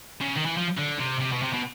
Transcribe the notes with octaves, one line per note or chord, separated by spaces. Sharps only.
C#3
D#3
E3
F3
D3
C3
C3
B2
C3
B2